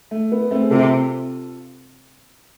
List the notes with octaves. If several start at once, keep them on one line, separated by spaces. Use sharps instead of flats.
A3
B3
A3 C4
G#4
C3 F4 A4